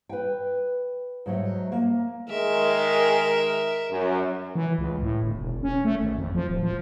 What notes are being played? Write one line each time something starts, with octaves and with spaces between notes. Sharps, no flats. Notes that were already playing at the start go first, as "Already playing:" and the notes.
B4 G5
G#2 F#3 A3
A#3
D#3 G#3 A#4 E5
F#2
E3
C#2
A2
G1
E1
C#4
A3
G#1
F2
F3
D1
F3